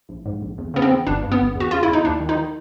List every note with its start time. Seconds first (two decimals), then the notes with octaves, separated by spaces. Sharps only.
0.09 A#1
0.26 G#2
0.42 A#1
0.58 E2
0.74 C#3 B3
0.82 C4
0.91 E2
1.07 G1 D4
1.23 G2
1.32 B3
1.39 G1
1.55 E2
1.60 F#4
1.71 C#3 F4
1.83 E2 E4
1.93 D#4
2.04 D#2 D4
2.20 D#3
2.29 D#4
2.36 D#3